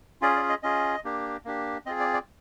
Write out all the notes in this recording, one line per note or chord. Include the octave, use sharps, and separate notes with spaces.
C#4 F4 G#4 D5
D5
D#5
C#4 F4 G#4 D#5
A#3 D4 G4
A#3 D4 G4
C4 F4 G#4 D#5
D5
D5